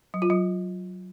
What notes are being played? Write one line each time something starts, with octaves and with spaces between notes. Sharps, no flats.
F#3
F4
F#3